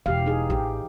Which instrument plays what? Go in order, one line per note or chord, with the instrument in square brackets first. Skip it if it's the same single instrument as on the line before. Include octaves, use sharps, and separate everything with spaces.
[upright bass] E1 [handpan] E3 G4 F5
[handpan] D#4 G#4
[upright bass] A1 F4 [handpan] G4